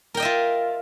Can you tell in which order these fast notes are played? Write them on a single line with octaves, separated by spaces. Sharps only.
A#4 G5 D#5 E5 F4